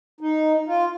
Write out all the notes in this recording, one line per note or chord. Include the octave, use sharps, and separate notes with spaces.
D#4
F4